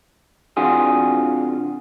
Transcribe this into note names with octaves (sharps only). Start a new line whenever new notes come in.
C3 E3 D4 F4 F#4 G#4